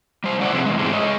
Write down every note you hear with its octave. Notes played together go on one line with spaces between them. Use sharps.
G3 C5
G#3 C#4 E4 D5 F5 F#5
C3 F3 C4 G4 G#4 B4
E2 G#3
E2 G#2 E3 G#3 A3 C4
G#3 G#4 C#5 D#5